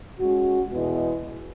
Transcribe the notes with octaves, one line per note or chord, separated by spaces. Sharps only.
G#3 C#4 F#4
E2 B2 G#3 B3 E4